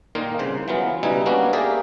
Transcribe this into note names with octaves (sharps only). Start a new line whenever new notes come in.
A#2 D#3 A#3 D#4 F4
C2 C#3 C5
E3 F#3 B3 F4
C#2 B2 G3 D#4 E5 G#5
A#3 B3 C#4 D4 F#4
A#3 G4 G#4 A#4 D5 E5